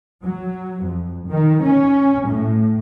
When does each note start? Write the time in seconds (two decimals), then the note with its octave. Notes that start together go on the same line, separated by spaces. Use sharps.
0.23 F#3
0.84 F2
1.27 D#3
1.64 C#4
2.26 A2